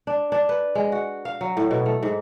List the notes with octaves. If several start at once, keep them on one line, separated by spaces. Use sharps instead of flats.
D4
D4
B4
G#3
F#4
F5
F#3
A2
B2
A3
G#2